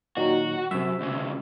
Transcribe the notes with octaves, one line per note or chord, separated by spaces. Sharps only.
A#2 D#3 F#3 F#4
F#2 C3 E5
D2 C#3